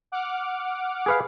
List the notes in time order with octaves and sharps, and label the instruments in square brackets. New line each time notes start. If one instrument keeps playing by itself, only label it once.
[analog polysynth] F#5 D6 F6
[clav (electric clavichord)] G#4 B4 F5